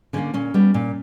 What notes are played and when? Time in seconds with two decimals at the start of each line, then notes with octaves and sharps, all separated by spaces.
0.13 D3 G3 A#3 C#4
0.34 A#2 C#4
0.54 G3 B3
0.74 A#2